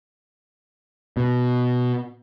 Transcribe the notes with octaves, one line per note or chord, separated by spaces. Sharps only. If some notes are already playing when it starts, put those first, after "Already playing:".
B2